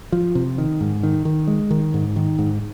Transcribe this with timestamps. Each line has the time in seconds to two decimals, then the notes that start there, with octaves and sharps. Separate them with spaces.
0.12 F3
0.35 C3
0.58 D#3
0.81 G#2
1.03 D#3
1.25 D#3
1.47 G#3
1.71 D#3
1.94 G#2
2.16 D#3
2.39 G#2